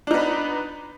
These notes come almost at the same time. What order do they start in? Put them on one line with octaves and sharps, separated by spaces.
D4 D#4 B3 B4